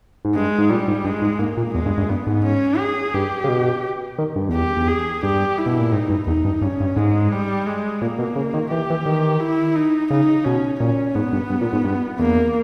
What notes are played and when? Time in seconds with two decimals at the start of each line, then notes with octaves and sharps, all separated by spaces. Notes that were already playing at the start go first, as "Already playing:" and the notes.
0.25 G#2
0.35 G2 G#3
0.59 G#2
0.70 A#2 G3
0.88 G#2
1.05 G2 G#3
1.22 G#2
1.39 G#2 A#3
1.57 A#2
1.74 E2 G#3
1.86 G2
1.98 G2
2.10 G2 B3
2.27 G#2
2.45 C#4
2.79 G#4
3.14 G2 G4
3.44 C#3
3.49 B2
4.18 D#3
4.36 G2
4.49 E2 G4
4.77 E2
4.88 G#4
5.23 G2 G4
5.58 E4
5.66 B2
5.79 A#2
5.92 G#2 D#4
6.10 G2
6.27 E2 D#4
6.45 G2
6.62 G2 C#4
6.80 G2
6.96 G#2 G#3
7.32 G3
7.67 G#3
8.02 A#2 A#3
8.19 B2
8.36 C#3
8.54 D#3
8.71 E3 G4
8.90 E3
9.06 D#3
9.40 E4
9.76 D#4
10.10 C#3 D#4
10.45 B2 C#4
10.80 A#2 C#4
11.15 G#2 B3
11.33 G2
11.50 G2
11.61 A#2
11.73 G#2
11.85 G2
12.19 E2 A#3